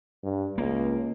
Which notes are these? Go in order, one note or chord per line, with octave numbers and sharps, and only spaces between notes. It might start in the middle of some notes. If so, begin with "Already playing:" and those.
G2
C#2 A#3